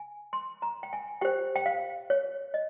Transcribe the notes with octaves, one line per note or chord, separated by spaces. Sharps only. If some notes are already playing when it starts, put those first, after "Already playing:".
Already playing: G#5
C6
A#5
G5
G#5
G4 C5 G5
G5
F5
C#5
D#5